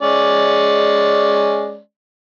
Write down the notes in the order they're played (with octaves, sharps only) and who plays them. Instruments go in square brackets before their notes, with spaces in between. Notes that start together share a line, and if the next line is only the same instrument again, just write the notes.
[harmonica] G#3 C#4 D5